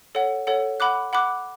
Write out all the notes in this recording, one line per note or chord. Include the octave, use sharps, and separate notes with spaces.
A4 C#5 F#5
A4 C#5 F#5
F#5 B5 D6 F#6
F#5 B5 D6 F#6